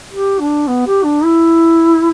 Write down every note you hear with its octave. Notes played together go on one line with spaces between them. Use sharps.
G4
D4
B3
G4
D4
E4